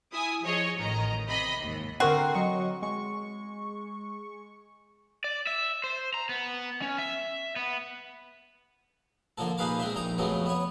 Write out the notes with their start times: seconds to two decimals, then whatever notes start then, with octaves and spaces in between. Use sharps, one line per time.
0.12 E4 G#5 D#6
0.43 F3 G#4 C#5 D#5
0.78 A1 D#3 D#5 A#5
1.26 C3 D#5 B5
1.60 D#2 G#2
2.00 D3 C4 F#4 A#4 C7
2.35 F#3 D#5 C#6
2.83 G#3 C#6
5.24 D5
5.47 E5
5.84 C5
6.14 A#5
6.29 B3
6.82 C#4
6.98 E5
7.56 B3
9.38 D3 F3 A#3 A4
9.58 A#2 D#4 G#4 B4 F5 D6
9.79 G#3 C4 C5 E5
9.96 A#1 D#4 A#5
10.18 F2 C#3 F#3 A3 B3
10.46 B3 C#5